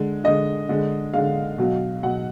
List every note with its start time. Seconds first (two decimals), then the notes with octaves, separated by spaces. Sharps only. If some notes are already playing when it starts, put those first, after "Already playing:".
Already playing: D3 G#3
0.24 D3 G#3 D#5
0.69 D3 G#3
1.14 D3 G#3 F5
1.58 B2 F#3
2.03 B2 F#3 F#5